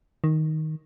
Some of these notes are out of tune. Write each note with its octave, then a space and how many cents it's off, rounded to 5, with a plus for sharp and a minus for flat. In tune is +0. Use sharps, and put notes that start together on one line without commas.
D#3 +5